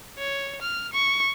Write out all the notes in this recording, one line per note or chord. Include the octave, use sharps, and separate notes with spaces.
C#5
F6
C#6